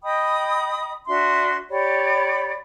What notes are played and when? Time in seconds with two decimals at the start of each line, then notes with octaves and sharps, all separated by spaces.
0.03 D#5 G5 B5 D#6
1.07 D4 F#4 E5 C6
1.69 G4 C#5 D5 B5